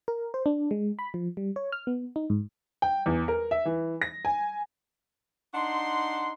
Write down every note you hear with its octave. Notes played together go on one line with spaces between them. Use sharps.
A#4
C5
D4
G#3
B5
F3
G3
C#5
F6
B3
D#4
G#2
G5
E2
A#4
E5
E3
A#6
G#5
D4 D#4 F#5 C6